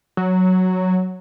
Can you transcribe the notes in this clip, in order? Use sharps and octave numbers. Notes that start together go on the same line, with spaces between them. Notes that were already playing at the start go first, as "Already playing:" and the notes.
F#3